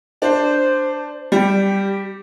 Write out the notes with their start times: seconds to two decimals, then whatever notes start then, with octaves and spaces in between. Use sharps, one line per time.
0.22 D4 C5
1.32 G3 G4